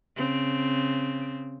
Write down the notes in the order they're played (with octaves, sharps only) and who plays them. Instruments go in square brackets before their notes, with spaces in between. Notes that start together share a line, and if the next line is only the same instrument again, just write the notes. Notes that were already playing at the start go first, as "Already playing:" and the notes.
[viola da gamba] C#3 C4